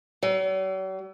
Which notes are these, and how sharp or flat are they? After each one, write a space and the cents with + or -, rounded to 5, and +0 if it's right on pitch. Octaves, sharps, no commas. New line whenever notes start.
F#3 +45